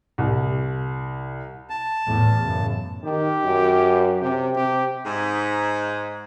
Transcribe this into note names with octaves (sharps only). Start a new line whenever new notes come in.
C2
A5
E2 A2
F#2 A2 C#3
D#3 G4
F#2
C3 G4
C3 G4
G#2